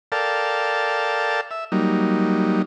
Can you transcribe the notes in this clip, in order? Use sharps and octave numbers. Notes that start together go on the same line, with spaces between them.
A4 A#4 D5 F5 G5 A5
E5
F#3 G3 A#3 D#4